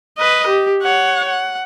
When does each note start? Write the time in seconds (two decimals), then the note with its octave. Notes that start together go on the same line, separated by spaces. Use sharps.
0.18 B4 D#5
0.47 G4
0.82 C#5 F#5
1.28 F#5